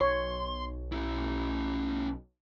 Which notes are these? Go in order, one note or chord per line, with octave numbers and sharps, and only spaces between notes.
B1 C#5 C6
C#4 E4